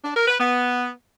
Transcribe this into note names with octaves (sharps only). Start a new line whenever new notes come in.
D4
A#4
B4
B3